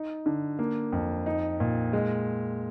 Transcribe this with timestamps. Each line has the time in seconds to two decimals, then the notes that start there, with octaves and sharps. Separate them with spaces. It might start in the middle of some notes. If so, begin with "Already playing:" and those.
Already playing: D#4
0.26 D3
0.59 A#3
0.92 F2
1.26 D#4
1.60 A#2
1.93 G#3